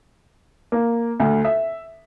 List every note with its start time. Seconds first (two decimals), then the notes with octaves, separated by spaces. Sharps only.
0.72 A#3
1.20 D2
1.45 E5